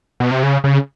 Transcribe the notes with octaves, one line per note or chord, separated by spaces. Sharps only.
B2
C3
C#3
C#3